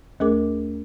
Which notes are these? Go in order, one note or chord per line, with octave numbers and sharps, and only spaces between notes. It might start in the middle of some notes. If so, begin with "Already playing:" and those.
D#2 A3 G#4 A#4 D6